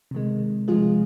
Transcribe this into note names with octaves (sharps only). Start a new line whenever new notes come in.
C3 D#3 G#3
C3 F3 G#3 F4 G#4